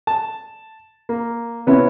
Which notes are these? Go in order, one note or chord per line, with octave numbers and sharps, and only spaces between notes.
A5
A#3
C3 B3 C#4 E4